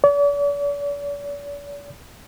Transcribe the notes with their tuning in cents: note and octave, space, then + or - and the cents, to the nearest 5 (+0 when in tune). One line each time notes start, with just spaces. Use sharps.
D5 -45